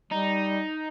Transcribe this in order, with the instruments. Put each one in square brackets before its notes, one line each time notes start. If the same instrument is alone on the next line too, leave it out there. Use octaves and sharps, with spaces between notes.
[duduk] G3 [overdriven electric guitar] D#4